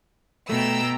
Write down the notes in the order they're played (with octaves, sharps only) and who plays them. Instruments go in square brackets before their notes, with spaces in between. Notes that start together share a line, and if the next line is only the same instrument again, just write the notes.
[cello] B2 [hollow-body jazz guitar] A3 [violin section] G5 A#5 E6